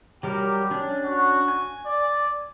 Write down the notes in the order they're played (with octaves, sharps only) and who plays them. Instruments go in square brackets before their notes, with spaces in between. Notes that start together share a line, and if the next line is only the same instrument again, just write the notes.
[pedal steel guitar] F#3 G3 A#4 [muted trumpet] G4
[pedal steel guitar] C#4 D4
[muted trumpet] F#4
[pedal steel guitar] G#5
[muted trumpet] D5